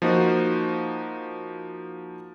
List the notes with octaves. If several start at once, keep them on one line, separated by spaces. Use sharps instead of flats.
F3 A#3 D#4 F#4 C5